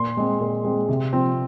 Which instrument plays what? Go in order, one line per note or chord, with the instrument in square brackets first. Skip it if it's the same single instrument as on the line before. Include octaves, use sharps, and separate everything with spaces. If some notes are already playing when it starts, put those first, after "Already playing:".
Already playing: [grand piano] A#2 C6
G#3 C4
A#2
G#3 C4
C3
F3 C4